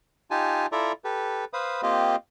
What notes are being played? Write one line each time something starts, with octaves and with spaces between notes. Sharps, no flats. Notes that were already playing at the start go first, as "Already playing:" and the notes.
D#4 F4 G4 G#5 A5
E4 F4 A4 D5 E5 A#5
G4 A4 B4
B4 C5 F5 B5 D#6
A#3 C4 F4 G4 D#5